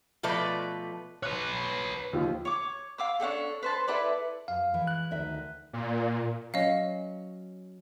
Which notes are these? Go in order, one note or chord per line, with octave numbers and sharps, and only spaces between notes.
B2 F3 A3 B4 D5
B4 C#5 F#6
D#2 F3
C#5 D6
F5 D6 E6
C#4 D4 G4 A4
B4 C5 A5
E4 A4 B4 D5
F#2 F5
E3 G#3
F#6
D2 D#3 E5
A#2
F#3 C#4 D#5 F5